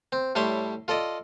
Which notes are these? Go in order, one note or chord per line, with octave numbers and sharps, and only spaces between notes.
C4
A2 G3 E4 C#5 C6
F4 A4 D5 D#5